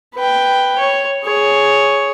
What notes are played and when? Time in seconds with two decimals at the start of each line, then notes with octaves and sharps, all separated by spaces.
0.15 B4 G5
0.79 C#5
1.25 G#4 C#5